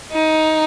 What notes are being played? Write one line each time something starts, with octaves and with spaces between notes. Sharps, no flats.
D#4